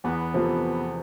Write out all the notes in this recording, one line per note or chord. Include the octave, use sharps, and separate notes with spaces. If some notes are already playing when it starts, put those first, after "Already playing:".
E2 B3
C3 F3 A3